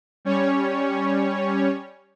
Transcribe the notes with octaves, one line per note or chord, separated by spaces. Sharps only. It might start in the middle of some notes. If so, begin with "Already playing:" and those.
G3 C#4 C#5